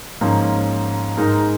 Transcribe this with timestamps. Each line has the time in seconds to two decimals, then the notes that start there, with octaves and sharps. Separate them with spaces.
0.21 G#2 F3 A#3 C#4 F4
1.17 G#2 G#3 D#4 A#4